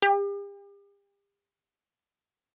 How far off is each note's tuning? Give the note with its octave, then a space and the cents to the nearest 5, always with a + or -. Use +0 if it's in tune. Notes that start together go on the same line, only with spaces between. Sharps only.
G4 +40